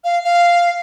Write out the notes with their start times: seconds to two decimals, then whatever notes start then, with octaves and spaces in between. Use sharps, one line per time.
0.04 F5
0.24 F5